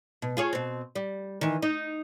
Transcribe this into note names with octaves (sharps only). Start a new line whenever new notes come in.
B2
F4 G#4 C#5
B2 C4
G3
D#3 E3
D#4